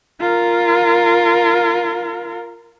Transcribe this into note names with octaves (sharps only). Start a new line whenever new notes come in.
F4 A#4